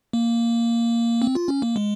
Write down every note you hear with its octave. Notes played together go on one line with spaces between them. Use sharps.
A#3
C4
F4
C#4
A#3
G#3